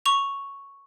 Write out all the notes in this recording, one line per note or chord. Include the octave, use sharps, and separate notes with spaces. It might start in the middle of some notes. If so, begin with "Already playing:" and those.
C#6 F7